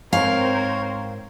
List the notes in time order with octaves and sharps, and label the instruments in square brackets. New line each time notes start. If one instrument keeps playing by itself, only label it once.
[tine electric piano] G#2 [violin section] C4 A#4 C5 [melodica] C#5 [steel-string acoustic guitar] F5